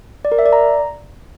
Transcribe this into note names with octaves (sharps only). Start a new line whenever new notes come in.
D5
A#4
E5
D5
A#5